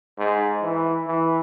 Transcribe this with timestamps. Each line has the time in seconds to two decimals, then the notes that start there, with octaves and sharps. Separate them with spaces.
0.18 G#2
0.62 E3
1.07 E3